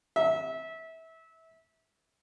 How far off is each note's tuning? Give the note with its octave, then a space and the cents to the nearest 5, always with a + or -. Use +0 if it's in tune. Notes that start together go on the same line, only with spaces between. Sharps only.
E5 -25